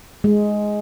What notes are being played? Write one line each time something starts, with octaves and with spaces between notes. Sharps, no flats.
G#3